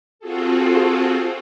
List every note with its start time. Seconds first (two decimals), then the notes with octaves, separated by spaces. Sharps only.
0.19 C4 F4 F#4 G#4 A4